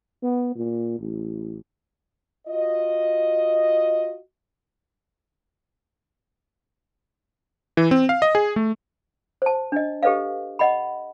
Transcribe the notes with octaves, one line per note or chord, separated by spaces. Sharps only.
B3
A#2
A1
F4 F#4 D#5
E3
C4
F5
D#5
G#4
A3
C5 A5
D4 D#5
G4 A4 B4 D#5 F5
D#5 F#5 B5